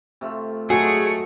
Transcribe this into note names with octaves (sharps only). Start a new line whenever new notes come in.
C3 A3 F4
A2 F#3 G#3 A3 F#4 G#4 C#7